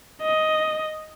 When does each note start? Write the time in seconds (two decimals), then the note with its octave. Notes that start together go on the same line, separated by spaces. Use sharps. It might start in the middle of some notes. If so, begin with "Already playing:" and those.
0.22 D#5